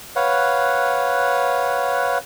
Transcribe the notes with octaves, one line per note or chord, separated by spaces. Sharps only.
B4 C#5 F5 F#5